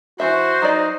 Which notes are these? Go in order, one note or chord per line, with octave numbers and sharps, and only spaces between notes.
E3 F#3 F#4 C5 E5
F#3 D#4 D5